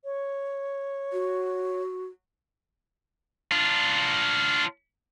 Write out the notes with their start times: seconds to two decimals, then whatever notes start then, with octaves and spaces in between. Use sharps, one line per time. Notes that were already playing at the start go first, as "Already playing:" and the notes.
0.04 C#5
1.13 F#4
3.52 D4 F4